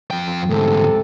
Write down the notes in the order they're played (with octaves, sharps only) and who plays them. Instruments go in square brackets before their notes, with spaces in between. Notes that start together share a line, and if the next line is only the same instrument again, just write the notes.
[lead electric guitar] F2 G5
[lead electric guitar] D2 G#2 [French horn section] C3 A4